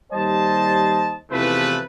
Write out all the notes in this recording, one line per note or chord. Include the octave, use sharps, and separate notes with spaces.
D#2 G3 C5 D#5 A5
E2 C3 E3 F3 A3 B4